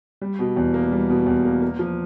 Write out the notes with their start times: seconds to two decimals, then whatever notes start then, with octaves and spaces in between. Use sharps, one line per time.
0.21 G3
0.39 B2
0.57 E2
0.74 A#3
0.92 G3
1.09 B2
1.26 E2
1.45 A#3
1.62 A#3
1.79 F3